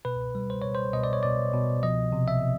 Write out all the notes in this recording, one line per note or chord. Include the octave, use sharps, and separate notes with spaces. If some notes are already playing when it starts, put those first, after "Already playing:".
B2 B4
G3
C5
B2 C#5
C5
B2 D#5
D5
C#5
B2 D5
B2
F3 D#5
C3
E5
C3